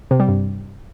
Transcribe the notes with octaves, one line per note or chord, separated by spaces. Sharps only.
C3
G3
G2